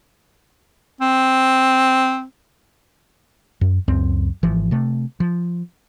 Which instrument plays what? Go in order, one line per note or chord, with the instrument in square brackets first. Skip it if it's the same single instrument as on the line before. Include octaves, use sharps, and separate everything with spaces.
[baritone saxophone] C4
[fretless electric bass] F#2
C#2 F#2 C4
G#1 E3 F3
C3 A3
F3